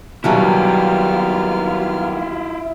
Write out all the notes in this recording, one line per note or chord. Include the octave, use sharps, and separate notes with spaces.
D#2 F#3 G3 A#3 B3 E4 F4 F6